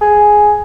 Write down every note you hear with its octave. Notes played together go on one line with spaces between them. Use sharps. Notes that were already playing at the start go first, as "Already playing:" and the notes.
G#4